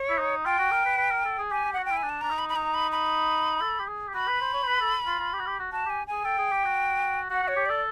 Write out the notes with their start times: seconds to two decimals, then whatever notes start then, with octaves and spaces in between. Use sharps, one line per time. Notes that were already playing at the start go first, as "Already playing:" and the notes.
Already playing: C#5
0.09 E4
0.19 D#4
0.45 F4 G5
0.58 F#4
0.71 A#4
0.86 B4
0.98 B4
1.11 A#4
1.25 A4
1.38 G#4
1.51 G4 G#5
1.65 G4
1.73 F#4 F#5
1.85 G5
1.91 E4
1.97 G#5
2.03 D4
2.09 A5
2.21 D4 A#5
2.30 D#4
2.39 B5
2.49 B5
2.56 D#4 A#5
2.74 B5
2.92 B5
3.61 A4
3.80 G4
3.88 G#4
4.08 G4
4.14 F#4 B5
4.28 B4
4.41 C5
4.53 C#5
4.63 C5
4.67 B4
4.81 A4
5.06 F4
5.19 F4
5.33 G4
5.39 F#4
5.47 G4
5.60 F#4
5.72 F#4 A5
5.86 G4 G#5
6.07 G#4 G#5
6.24 A4 G5
6.38 G#4
6.52 G4
6.64 F#4
7.30 F#4 F#5
7.43 F#4 C#5
7.56 G4
7.66 A4 D5